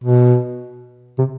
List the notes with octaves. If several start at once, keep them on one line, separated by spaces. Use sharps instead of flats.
B2
C3